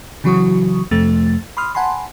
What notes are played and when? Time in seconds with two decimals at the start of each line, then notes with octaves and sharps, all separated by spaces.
0.24 C#3 E3 F#3 F#4 C#6 D#6
0.91 F2 C3 F3 A3 A6
1.57 B5 C6 D#6 F6
1.75 F#5 G#5 A5 B5 C6